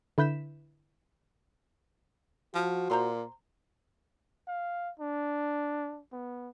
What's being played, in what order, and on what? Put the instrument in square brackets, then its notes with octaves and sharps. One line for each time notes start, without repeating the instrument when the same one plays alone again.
[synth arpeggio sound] D3 E4 B4 G6 B6 E7
[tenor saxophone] F3 [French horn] F#4
[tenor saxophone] A#2 [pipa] C5 A#5 C6
[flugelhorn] F5
D4
B3